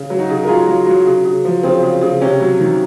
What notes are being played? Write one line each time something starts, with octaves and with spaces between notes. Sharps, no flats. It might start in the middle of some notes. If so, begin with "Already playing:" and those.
Already playing: C#3
F#3
D#4 F#4
C#3
A#4
F#3 F4 G#4
F#3
F#3
C#3
C#3
F3
C#3 C4
C#3
C#3
C3 C#4
F#3
D#3